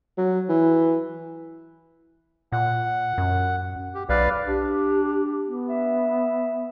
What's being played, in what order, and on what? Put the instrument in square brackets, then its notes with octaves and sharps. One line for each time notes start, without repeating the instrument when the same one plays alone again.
[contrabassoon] F#3
E3
[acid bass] A#2 [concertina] F#5
[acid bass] F#2
[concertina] G4
[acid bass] B1 [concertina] B4 D5 F5
[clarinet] D4 [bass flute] G4
[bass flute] B3
[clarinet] E5